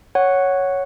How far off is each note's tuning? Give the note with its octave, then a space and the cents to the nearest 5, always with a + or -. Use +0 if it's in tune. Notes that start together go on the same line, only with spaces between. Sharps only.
C#5 +0 F#5 +0